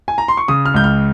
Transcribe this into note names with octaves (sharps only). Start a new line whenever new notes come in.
G#5
A#5
C6
C#6
C#3 D#6
F6
C#2 G6
F6